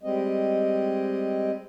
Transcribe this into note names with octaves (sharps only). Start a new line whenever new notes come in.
G3 G#3 C4 D#5